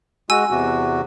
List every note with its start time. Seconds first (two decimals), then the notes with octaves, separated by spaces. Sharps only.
0.30 G#3 F#4 G#5 E6
0.51 E2 C3 F#4